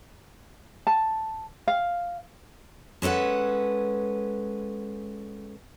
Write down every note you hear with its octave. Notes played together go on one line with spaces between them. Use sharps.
A5
F5
G#3 C#4 A4 B4 F#5